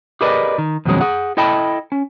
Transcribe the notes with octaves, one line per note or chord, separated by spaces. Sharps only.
G4 G#4 A#4 B4 D5 D#5
D#3
F2 B2 D#3 F#3 G#3 C#4
G#4 F#5
E4 A4 D#5 G5 A5 B5
C#4